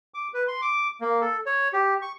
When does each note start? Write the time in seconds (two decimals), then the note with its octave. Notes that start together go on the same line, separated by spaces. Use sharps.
0.14 D6
0.34 B4
0.48 C6
0.62 D6
1.01 A#3
1.21 A4
1.46 C#5
1.73 G4
2.02 C#6